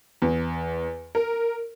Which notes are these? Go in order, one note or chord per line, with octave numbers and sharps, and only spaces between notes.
E2
A#4